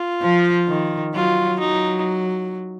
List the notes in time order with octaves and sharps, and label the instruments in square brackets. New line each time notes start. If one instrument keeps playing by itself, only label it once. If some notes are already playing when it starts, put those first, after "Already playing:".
Already playing: [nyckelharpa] F4
[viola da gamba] F3
D#3
[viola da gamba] F#3 [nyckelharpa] F4
[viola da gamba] F#3 [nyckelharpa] D#4